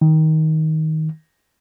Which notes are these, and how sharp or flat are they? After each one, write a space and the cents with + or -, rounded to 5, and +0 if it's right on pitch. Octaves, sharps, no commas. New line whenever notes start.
D#3 +15